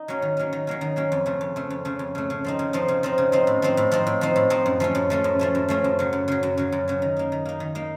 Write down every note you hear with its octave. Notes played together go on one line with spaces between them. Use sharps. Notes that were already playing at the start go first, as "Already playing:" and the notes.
Already playing: D#4
F#3 A#3 C#4
D#3
F#3 A#3 C#4
D#3
F#3 A#3 C#4
D#3
F#3 A#3 C#4
F2
C#3 A3
F2
C#3 A3
F2
C#3 A3
F2
C#3 A3
C#3
F3 C4 D#4
C#3
F3 C4 D#4
C#3
F3 C4 D#4
C#3
F3 C4 D#4
A2
F3 C4 D#4
A2
F3 C4 D#4
A2
F3 C4 D#4
A2
F3 C4 D#4
F#2
F3 A3 C#4
F#2
F3 A3 C#4
F#2
F3 A3 C#4
F#2
F3 A3 C#4
F#2
C#3 F#3
F#2
C#3 F#3
F#2
C#3 F#3
F#2
C#3 F#3
D#3
A#3 D#4
D#3
A#3 D#4
D#3
A#3 D#4